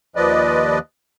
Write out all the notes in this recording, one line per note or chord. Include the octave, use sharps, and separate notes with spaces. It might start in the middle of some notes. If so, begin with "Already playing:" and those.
D#2 F3 B4 D5 D#5